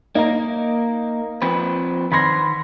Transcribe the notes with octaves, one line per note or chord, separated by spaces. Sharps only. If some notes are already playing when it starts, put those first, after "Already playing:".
A#3 D#4 A#4
F3 C4 B4
D#3 B5 C6 G#6 A#6